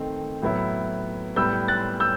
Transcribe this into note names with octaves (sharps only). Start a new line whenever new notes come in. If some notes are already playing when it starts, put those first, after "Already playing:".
Already playing: D#3 A3 C4
A2 F#3 B3 E4
A2 G3 B3 E6 G6
F#6 A6
E6 G6